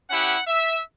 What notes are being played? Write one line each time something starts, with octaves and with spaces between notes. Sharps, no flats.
C#4 E4 G4 F#5
E5